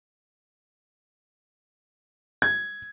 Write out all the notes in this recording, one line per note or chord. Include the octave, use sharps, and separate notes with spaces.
G#6